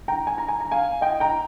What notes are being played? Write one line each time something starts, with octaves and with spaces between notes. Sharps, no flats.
G5 A#5
G#5
A#5
G#5
A#5
F5 G#5
D#5 G5
G5 A#5